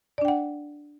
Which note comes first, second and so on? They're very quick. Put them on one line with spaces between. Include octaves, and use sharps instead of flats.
D5 D4 G5 F#5